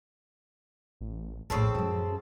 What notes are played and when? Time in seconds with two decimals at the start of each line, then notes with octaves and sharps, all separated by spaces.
1.01 A1
1.50 A#1 F#2 A2 C#3 C4 A4
1.75 F#2 F3 G#3